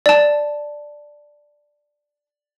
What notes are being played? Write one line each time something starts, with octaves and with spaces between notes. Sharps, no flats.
D5 A5